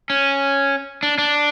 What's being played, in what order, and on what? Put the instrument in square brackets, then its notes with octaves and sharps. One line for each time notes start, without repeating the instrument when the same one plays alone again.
[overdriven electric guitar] C#4
D4
D4